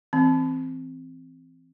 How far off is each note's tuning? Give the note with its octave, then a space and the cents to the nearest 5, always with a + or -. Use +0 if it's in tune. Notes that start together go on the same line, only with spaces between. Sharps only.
E3 -10 C4 +0